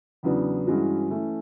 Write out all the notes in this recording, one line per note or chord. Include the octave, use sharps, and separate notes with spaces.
E2 C#3 F#3 B3 D4
G2 E3 G#3 C#4 F#4
E3 A3 C#4